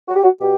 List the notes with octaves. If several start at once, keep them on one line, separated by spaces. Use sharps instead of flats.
F#4
G4
F#4
B2 G4